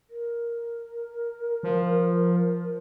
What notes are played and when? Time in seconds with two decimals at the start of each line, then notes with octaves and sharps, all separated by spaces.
0.10 A#4
1.63 F3